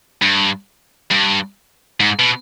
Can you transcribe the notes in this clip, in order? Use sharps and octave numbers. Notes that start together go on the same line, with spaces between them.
G2
G2
G#2
B2